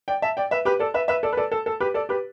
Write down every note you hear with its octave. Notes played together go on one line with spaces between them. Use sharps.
D5 G5
E5 A5
D5 G5
B4 E5
G4 B4
A4 D5
B4 E5
B4 E5
A4 D5
B4
A4 D5
A4
A4
G4 B4
A4 D5
G4 B4